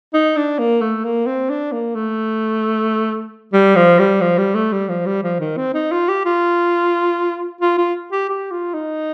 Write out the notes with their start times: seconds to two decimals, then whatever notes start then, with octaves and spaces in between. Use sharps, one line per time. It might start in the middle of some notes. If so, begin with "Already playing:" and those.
0.14 D#4
0.37 D4
0.59 A#3
0.81 A3
1.04 A#3
1.26 C4
1.50 D4
1.72 A#3
1.95 A3
3.53 G3
3.76 F3
3.99 G3
4.21 F3
4.38 G3
4.55 A3
4.72 G3
4.89 F3
5.06 G3
5.23 F3
5.40 D#3
5.57 C4
5.74 D#4
5.92 F4
6.09 G4
6.25 F4
7.61 F4
7.78 F4
8.12 G4
8.29 G4
8.51 F4
8.74 D#4